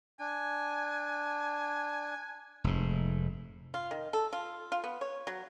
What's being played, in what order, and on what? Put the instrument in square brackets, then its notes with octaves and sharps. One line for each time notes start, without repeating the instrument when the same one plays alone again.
[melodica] D4 [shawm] G#5
[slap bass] F1 G#2
[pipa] F4
D#3
A4
F4
F4
B3
C#5
F#3